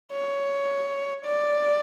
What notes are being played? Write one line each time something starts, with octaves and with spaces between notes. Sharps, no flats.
C#5
D5